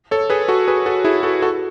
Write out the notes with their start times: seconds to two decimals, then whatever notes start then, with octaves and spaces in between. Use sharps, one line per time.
0.11 A4 C#5
0.30 G#4 B4
0.48 F#4 A4
0.68 G#4 B4
0.86 F#4 A4
1.05 E4 G#4
1.23 F#4 A4
1.42 F#4 A4